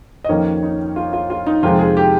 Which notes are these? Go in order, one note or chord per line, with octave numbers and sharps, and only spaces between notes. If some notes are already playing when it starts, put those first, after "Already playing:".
D#5
F2 D#3 A#3 C#4 C#5
D#4
F4
F4
F4
D#4
F2 C3 D#3 G#3 F4
G#4
G4